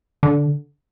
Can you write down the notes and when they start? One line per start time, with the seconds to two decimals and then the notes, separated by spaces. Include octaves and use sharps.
0.23 D3